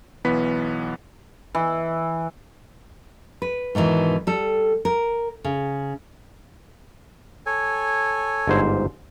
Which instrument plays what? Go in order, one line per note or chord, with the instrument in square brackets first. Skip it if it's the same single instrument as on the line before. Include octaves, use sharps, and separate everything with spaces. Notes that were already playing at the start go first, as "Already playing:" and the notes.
[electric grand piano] B1 E3 B3 B5 B6
[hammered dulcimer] E3
[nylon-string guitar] B4
G#2 B2 D#3 E3
G3 A4
A#4
C#3
[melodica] A4 C#5 G#5
[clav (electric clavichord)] G1 G#2 C5